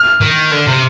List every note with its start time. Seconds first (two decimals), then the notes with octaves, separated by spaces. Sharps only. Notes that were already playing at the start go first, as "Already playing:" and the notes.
Already playing: F6
0.21 D#3
0.51 D3
0.67 C3